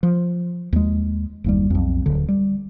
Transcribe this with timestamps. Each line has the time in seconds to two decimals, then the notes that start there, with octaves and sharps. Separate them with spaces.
0.03 F3
0.73 D#2 G#3
1.44 F#1 D#2 G3
1.70 B1 F2
2.06 D1 D3
2.28 G3